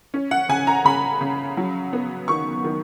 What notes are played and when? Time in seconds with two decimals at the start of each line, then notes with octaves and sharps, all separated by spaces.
0.14 C#4
0.31 F#5
0.49 C#3 G#5
0.67 A#5
0.85 C#3 B5
1.21 C#3
1.57 F#3
1.93 B3
2.28 D#3 C#6
2.65 D#3